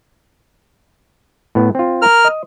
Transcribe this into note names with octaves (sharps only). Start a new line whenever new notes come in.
A2 B3
C4 F4
A#4 F6
D#5